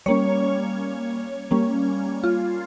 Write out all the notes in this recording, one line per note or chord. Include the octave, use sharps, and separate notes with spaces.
G3 A#3 C#4 C#5
G3 A#3 C#4
F4